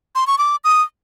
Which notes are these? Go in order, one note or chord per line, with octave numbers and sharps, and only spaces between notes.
C6
C#6
D6
D#6